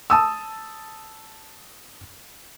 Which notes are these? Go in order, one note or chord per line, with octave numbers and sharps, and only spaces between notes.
A5 D#6 E6